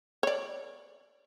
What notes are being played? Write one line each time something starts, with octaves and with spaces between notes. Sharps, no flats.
C#5 D5